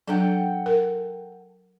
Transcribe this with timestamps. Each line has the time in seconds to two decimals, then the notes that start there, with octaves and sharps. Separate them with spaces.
0.08 F#3 D4 A4 F#5 G5
0.66 A#4